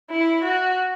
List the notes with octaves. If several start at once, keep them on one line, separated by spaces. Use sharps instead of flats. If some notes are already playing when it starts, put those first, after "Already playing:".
E4
F#4